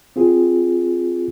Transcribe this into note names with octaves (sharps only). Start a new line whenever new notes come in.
C4 F4 G#4